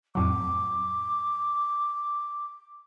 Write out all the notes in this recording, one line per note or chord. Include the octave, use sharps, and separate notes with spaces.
F2 A2 F#3 D6